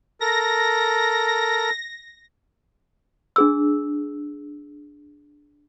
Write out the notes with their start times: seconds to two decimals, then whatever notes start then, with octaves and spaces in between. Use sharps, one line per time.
0.21 A4 A#4 A#6
3.36 D4 G#4 E6